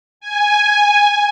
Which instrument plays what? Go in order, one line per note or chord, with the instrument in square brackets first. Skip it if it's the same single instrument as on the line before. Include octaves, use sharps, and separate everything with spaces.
[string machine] G#5